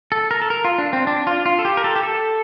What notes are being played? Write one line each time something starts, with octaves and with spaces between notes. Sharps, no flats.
A4
A#4
A4
A#4
F4
D4
C4
D4
F4
F4
A4
G4
A#4
A4
G4
A4